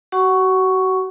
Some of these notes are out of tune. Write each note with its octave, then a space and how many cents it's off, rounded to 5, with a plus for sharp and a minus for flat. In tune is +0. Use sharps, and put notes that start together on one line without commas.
F#4 +35 F#5 +10 C#6 +5